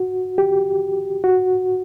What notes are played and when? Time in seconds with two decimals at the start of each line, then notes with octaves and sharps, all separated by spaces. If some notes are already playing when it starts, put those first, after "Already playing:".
Already playing: F#4
0.38 G4
1.24 F#4